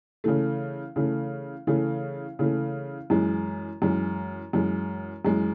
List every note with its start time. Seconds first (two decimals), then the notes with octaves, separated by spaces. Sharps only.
0.24 C#3 E3 A3
0.96 C#3 E3 A3
1.67 C#3 E3 A3
2.39 C#3 E3 A3
3.10 F#2 E3 G#3
3.82 F#2 E3 G#3
4.53 F#2 E3 G#3
5.25 F#2 E3 G#3